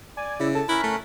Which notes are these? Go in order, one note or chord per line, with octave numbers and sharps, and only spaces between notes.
D5 G#5
C#3 E4
A4 A5
C#4 E4 A#4 F#6 B6
A3